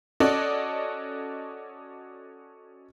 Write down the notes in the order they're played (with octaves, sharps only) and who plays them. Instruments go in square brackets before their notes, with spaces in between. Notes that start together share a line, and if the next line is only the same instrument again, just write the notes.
[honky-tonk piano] C#4 F#4 A4 D5 D#5